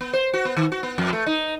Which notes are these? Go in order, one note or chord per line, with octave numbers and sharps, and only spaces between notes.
B3
C5
F#4
B3
D#3
F#4
B3
F2
A3
D#4